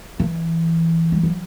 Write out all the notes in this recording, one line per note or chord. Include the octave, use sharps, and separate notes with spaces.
E3
G3
F#3